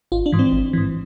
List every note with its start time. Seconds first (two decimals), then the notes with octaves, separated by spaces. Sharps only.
0.12 G#1 F4
0.26 D4
0.32 G#2 E3
0.39 C4
0.52 G#1
0.73 G#2 E3